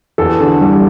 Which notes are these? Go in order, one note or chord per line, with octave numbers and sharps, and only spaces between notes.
E2 A4
D3
G3